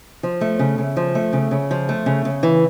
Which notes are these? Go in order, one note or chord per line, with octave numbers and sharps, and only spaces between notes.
F3
A3
C#3
C#3
F3
A3
C#3
C#3
F3
A3
C#3
C#3
E3